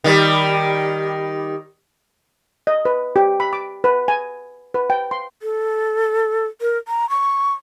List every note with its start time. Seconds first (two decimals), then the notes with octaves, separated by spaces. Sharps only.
0.04 D#3 G3
2.67 D#5
2.85 B4
3.16 G4
3.40 B5
3.53 D6
3.84 B4
4.08 G#5
4.74 B4
4.90 G5
5.11 C6
5.41 A4
6.61 A#4
6.88 A#5
7.10 C#6